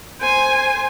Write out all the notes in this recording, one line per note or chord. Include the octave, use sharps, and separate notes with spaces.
C5 G#5